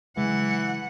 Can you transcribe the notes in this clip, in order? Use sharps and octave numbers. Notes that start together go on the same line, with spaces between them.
C#3 E3 F#3 G#3 F#5